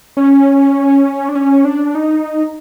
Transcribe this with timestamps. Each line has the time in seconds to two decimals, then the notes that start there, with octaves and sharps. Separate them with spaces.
0.17 C#4
1.29 D4
1.35 C#4
1.65 D4
1.95 D#4